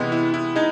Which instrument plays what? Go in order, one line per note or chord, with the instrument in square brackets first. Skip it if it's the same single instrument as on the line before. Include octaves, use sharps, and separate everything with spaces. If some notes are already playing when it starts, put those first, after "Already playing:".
Already playing: [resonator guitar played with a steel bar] C3 E3 G#3 [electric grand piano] B3
[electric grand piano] E4
E4
[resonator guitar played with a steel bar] G#3 [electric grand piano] D#4